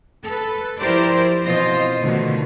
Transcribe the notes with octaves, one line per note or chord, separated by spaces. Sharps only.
A4 B4
F3 E4 G4 A#4 C5 D5
B2 E3 C4 F4 C5 D#5
B2 D3 D#3 F3 A3